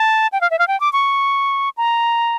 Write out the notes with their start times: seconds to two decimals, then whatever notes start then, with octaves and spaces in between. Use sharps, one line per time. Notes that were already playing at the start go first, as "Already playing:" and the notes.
Already playing: A5
0.32 G5
0.41 F5
0.51 E5
0.59 F5
0.68 G5
0.80 D6
0.93 C#6
1.77 A#5